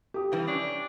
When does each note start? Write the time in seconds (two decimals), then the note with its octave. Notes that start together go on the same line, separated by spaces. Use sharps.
0.14 G4 D#6
0.32 C3 E3 G3
0.47 C#4 D4